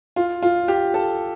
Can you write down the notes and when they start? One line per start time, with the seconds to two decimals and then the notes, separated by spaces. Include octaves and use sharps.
0.16 F4
0.42 F4
0.68 G4
0.94 A4